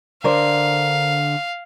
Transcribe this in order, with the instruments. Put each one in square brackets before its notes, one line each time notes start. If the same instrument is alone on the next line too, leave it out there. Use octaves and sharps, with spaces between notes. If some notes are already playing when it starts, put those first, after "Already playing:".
[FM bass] D3 [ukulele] A#4 C5 D5 [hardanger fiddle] F5